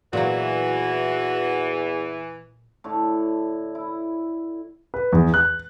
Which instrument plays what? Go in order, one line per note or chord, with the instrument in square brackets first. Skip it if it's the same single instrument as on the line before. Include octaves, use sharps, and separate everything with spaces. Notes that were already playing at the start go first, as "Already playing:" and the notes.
[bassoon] E2 [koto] A#2 F#3 [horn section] E3 [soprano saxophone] F#4
[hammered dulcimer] A2 D3 C#6
E4
[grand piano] B4
E2
F#6